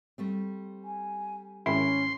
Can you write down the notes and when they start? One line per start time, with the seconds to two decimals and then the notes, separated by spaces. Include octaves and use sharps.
0.18 G3 A3 C4
0.84 G#5
1.66 G#1 C#4 E4 C6